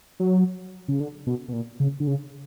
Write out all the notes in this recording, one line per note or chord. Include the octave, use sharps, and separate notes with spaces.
F#3
C#3
D3
B2
B2
A#2
C#3
D3
C#3